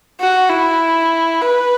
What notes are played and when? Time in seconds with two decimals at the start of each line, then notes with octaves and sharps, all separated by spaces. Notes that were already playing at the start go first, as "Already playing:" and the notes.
0.20 F#4
0.49 E4
1.41 B4